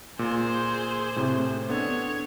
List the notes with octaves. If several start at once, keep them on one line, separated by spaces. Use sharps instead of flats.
A#2 G#4 C5
A2 C3
B3 D4 A4 C#5